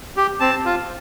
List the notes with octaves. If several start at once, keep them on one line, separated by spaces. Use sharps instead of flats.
G4
C4 A5
F4